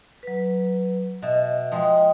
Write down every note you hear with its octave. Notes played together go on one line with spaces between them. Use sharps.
F#3 B4
B2 E5
F3 G#3 G5 D#6